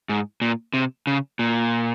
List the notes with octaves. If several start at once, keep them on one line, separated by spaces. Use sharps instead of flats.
G#2
A#2
C3
C#3
A#2